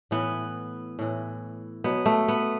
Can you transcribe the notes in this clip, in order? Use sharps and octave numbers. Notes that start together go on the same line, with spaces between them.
A2 E3 B3
A2 E3
B2 F#3 B3
A3
B3